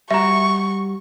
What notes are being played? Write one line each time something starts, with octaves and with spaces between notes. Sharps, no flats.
G3 F#4 E5 A#5 C#6